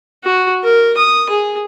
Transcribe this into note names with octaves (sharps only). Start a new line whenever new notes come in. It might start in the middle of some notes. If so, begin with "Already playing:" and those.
F#4
A#4
D#6
G#4